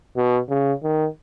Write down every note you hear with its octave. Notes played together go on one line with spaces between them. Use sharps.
B2
C#3
D#3